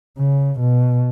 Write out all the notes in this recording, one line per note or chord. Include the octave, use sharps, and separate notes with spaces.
C#3
B2